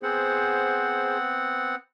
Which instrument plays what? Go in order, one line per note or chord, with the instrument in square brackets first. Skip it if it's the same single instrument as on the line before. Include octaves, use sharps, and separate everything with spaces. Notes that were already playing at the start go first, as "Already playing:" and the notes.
[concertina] B3 C4 F#5 [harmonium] G#4 C5